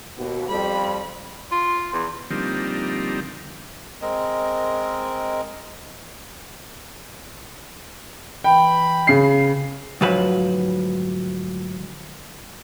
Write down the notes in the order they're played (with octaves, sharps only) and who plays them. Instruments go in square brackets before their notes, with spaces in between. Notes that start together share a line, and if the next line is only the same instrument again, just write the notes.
[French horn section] D#2 B2
[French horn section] F2 G3 [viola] B5
[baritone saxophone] F4
E2
[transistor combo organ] D3 F3 G3 A#3 C4 D#4
[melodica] G#3 C4 A#4 D#5
[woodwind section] E3 B5 [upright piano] G5
[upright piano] C#3 C7
[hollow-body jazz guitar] D2 G#2 F3 F#3 B4 B5